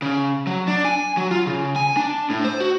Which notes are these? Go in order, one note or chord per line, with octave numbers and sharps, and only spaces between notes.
C#3
F#3
D4
G#5
F#3
F4
C#3
G#5
D4
A2
C5
F#4